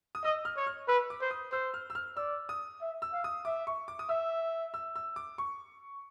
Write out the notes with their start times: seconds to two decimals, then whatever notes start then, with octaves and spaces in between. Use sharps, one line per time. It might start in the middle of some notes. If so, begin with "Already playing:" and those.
0.15 D#6
0.24 D#5 E6
0.45 F6
0.56 C#5
0.67 F6
0.88 B4 E6
1.10 D6
1.21 C5
1.31 D#6
1.52 C5 E6
1.74 F6
1.90 E6
1.95 F6
2.17 D5 E6
2.49 D#6
2.81 E5
3.02 E6
3.13 F5
3.24 D#6
3.45 E5 D6
3.67 C#6
3.88 D6
3.99 D#6
4.09 E5 E6
4.74 E6
4.96 E6
5.16 D6
5.38 C#6